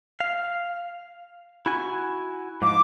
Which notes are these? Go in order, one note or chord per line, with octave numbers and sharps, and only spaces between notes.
F5
E4 F#4 G#5
G#2 F3 D6